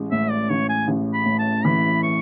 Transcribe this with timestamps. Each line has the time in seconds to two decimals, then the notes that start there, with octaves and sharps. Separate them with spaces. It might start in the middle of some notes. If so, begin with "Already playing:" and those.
Already playing: A1 G#3
0.11 A2 E5
0.31 D5
0.50 A1 C#5
0.69 G#5
0.88 A1
1.14 B5
1.26 A2
1.39 A5
1.65 E3 B5
2.03 C#6